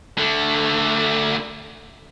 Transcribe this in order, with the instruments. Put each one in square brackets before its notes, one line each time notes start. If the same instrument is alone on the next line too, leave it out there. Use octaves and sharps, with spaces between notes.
[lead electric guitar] D3 A3